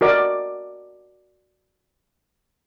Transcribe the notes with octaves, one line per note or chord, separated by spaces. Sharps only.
F#4 A#4 D5 D#5 D6